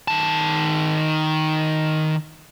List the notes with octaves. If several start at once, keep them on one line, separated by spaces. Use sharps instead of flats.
D#3 A5